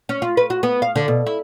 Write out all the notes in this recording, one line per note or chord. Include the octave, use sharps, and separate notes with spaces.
C#4
F4
B4
F#4
B3
F5
D3
B2
E4